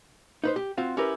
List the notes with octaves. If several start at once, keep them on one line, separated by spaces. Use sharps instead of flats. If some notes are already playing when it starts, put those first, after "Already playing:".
D#4 B4 C5
G4
C4 F4 F#4
C#4 E4 G4 A#4 B4